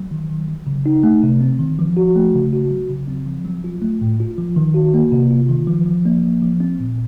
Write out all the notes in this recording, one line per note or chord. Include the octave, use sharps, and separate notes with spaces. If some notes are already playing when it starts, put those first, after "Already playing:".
Already playing: F#3
D#3
D#3
F#3
C#3
D#4
A3
C3
C4
D#3
F3
F#4
A3
C#3
F#4
F#3
C#3
C4
F3
F#3
F4
A3
A2
F4
F3
D#3
F#4
A#3
C3
F4
D#3
F3
F3
A#3
F3
F3
C4
A#2